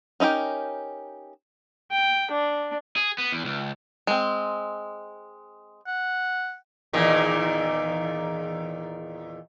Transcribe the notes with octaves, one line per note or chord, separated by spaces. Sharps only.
C#4 D#4 E4 G4 A#4
G5
D4
G#4
B3
E2
C#2
G#3 C4
F#5
E2 A#2 D#3